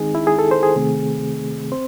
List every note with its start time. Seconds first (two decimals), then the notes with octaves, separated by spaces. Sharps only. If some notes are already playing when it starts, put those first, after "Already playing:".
Already playing: D#3 G#3 C4 D#4 G#4
0.15 E4
0.27 G#4
0.39 A4
0.51 C5
0.63 G#4
0.76 C3 D#3 A3 C4
1.72 C4 C5